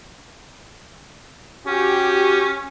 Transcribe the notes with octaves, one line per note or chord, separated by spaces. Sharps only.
C#4 F#4 G4